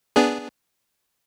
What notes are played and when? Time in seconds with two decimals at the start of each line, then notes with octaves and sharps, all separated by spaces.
0.16 B3 D4 G#4